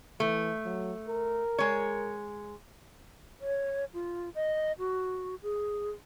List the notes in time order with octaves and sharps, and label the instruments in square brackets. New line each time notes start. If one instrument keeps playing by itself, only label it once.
[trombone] E3 [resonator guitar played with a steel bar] A3
[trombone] F#3
A#4
[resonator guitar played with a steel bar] G#3 C#5
[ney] C#5
F4
D#5
F#4
G#4